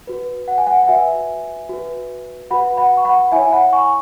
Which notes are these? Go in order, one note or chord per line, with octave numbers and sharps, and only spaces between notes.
F#4 B4
F#5
G#5
F#5
F#5
F#4 B4 E5 G#5
F#4 B4
F#4 B4 F#5 B5
F#5 B5
C#6
F#5 B5
E4 C#5 E5 G#5
F#5 B5
G#5 C#6